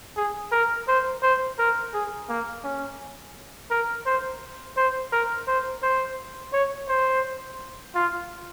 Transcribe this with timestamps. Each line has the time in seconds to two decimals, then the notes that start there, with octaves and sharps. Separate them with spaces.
0.16 G#4
0.52 A#4
0.88 C5
1.23 C5
1.58 A#4
1.93 G#4
2.29 A#3
2.64 C#4
3.70 A#4
4.06 C5
4.77 C5
5.12 A#4
5.47 C5
5.83 C5
6.53 C#5
6.88 C5
7.95 F4